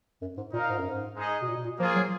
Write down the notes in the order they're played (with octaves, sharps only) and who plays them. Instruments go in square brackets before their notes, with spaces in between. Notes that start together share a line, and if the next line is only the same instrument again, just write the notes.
[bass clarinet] F#2
G#2
[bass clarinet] A#2 [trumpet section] D#4 A#4 F5
[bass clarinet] G#2
F#2
G#2
[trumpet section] G#3 D#4 G#4 D#5
[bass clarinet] B2
A#2
B2
A#2
[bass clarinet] F3 [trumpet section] A#3 F4 G#4
[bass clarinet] F#3